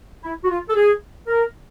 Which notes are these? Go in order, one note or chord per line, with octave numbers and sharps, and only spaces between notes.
E4
F#4
F4
A4
G#4
A#4